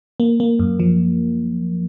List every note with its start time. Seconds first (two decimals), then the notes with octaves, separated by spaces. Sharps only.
0.20 A#3
0.40 A#3
0.59 F#2
0.80 F3